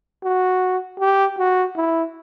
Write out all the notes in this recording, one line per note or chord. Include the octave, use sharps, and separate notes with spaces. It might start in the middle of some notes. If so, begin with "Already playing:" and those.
F#4
G4
F#4
E4